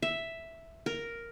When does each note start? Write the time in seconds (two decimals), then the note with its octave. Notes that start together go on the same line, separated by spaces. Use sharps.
0.02 E5
0.86 A#4